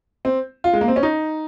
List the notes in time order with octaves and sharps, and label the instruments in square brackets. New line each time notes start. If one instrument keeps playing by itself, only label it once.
[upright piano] C4
F4
G#3
A#3
C4
C#4
D#4